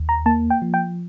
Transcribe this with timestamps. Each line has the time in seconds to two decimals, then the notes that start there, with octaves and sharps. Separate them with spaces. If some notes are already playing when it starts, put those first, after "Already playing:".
Already playing: D#2
0.09 A#5
0.26 A#3 A5
0.50 G5
0.62 F3
0.74 G5